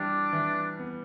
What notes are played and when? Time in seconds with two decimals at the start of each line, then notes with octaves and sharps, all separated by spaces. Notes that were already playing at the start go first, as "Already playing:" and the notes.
Already playing: E3 G3 D4
0.33 E3
0.79 B3